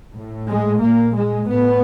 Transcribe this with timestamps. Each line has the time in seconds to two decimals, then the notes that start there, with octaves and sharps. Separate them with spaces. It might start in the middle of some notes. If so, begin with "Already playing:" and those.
0.15 A2
0.48 G#3
0.81 A#2 A#3
1.14 G#3
1.47 A2 B3